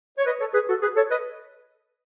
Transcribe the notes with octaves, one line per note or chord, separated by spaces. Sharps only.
C#5
B4 D#5
A4 C#5
G#4 B4
F#4 A4
G#4 B4
A4 C#5
B4 D#5